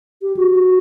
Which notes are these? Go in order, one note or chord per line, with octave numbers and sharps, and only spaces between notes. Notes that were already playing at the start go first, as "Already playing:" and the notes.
G4
F#4
F#4